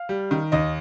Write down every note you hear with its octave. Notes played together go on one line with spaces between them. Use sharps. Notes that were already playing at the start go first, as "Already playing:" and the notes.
Already playing: F5
G3
D#3
D#2 D#5